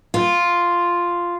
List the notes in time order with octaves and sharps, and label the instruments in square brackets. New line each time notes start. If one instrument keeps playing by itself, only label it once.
[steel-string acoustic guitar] F4